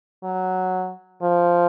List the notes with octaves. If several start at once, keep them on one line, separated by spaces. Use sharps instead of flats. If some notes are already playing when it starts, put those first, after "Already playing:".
F#3
F3